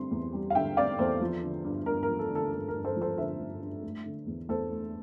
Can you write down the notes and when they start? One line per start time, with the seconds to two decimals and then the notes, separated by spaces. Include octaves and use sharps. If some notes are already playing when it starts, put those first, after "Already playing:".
Already playing: D3 G3 C4 C6
0.11 E2
0.33 G3
0.50 F5
0.55 D3 E5 G5
0.77 C4 D5 F5
0.99 E2 A4 C5
1.21 F3
1.43 D3
1.64 G2
1.86 G2 A#4
2.03 A#4
2.09 F3
2.19 A4
2.30 D3
2.35 A4
2.52 G2 A4
2.68 A#4
2.74 G2
2.85 A4 C5
2.96 F3
3.01 A4 C5
3.18 D3 C5 E5
3.40 G2
3.61 G2
3.83 A3
4.06 D3
4.27 E2
4.49 E2 A4 C5
4.71 A3